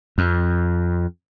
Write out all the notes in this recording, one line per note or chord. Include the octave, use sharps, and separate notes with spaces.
F2